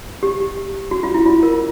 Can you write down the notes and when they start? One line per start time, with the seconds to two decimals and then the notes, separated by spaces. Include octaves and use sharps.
0.23 G4
0.91 F#4
1.03 F4
1.14 E4
1.26 F4
1.43 A#4